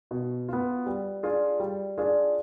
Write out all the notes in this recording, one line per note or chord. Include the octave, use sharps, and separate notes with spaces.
B2
B3 F4
G3
D4 F4 G#4
G3
D4 F4 G#4